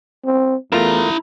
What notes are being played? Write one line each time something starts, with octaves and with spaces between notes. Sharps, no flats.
C4
E2 A3 E4 F4 A#4 A#5